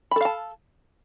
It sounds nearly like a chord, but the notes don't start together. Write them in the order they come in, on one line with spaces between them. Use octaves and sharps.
B5 A4 F5 A5